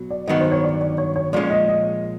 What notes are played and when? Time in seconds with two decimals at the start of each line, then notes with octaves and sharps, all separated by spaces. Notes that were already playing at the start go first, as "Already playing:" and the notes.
Already playing: B2 F#3
0.10 D5
0.27 G2 D#3 F#3 B3 D#5
0.40 C5
0.52 C#5
0.64 D5
0.81 D5
0.98 C#5
1.16 C#5
1.33 A#2 F3 G#3 C#4 D5
1.50 D#5
1.68 D#5